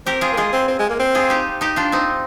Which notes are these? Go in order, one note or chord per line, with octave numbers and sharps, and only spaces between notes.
C4 G4 A#4
F4 G#4
A#3
G#3 F4 G#4
C4
C4
G#3
A#3
C4
F4 G#4
D#4 G4
D#4 G4
D4 F4
C4 D#4